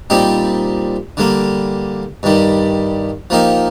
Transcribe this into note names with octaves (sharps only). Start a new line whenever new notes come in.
A#2 G3 C4 D#4 G4
D3 G3 A#3
G2 D#3 G3
F3 A#3 D#4 G4